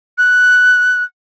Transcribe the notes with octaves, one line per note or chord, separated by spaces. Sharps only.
F#6